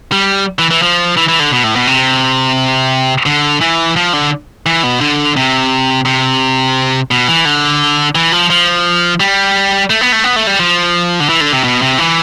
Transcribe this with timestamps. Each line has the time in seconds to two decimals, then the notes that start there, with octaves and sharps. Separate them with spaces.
0.12 G3
0.59 E3
0.71 E3
0.82 F3
1.17 E3
1.28 E3
1.40 D3
1.52 B2
1.64 A2
1.76 B2
1.87 C3
3.26 D3
3.61 E3
3.96 F3
4.13 D3
4.66 E3
4.83 B2
5.01 D3
5.36 C3
6.05 C3
7.11 B2
7.28 E3
7.45 D3
8.15 E3
8.32 F3
8.50 F3
9.20 G3
9.90 A3
10.01 B3
10.12 A3
10.24 B3
10.36 A3
10.47 G3
10.60 F3
11.20 D3
11.29 E3
11.41 D3
11.52 C3
11.64 B2
11.82 C3
11.98 E3